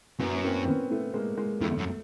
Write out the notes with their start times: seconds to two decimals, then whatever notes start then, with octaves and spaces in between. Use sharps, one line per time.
0.20 F#2 B3 C#4
0.35 B3
0.45 A#3 C4
0.62 C4
0.67 B3 C#4
0.90 A3 B3
1.14 G#3 A#3
1.37 G#3 A#3
1.61 F2 A3
1.78 F#2